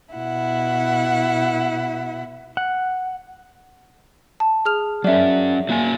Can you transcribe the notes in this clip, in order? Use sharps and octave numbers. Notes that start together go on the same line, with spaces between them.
B2 E4 F#5
F#5
A5
G#4 F6 F7
F#3 C#4 D5 E5
F#3 A#3 G#5